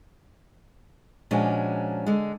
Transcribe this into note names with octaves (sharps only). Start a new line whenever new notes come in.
A#2 F3 G#3 C#4 D4 F#4
D3 G#3